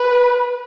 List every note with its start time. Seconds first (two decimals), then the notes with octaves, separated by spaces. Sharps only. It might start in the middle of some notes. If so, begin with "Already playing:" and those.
Already playing: B4